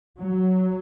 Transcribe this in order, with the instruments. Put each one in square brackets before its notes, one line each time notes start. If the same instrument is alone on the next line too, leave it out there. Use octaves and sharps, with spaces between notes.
[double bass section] F#3